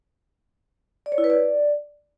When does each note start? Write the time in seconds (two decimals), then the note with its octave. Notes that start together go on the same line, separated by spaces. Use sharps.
1.06 D5
1.12 C#5
1.18 E4
1.24 B4
1.30 D5